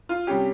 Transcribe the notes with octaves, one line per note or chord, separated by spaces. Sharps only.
F4
C3 G3 C#4 G4